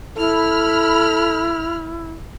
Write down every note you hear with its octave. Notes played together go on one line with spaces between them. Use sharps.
E4 A4 B5 F6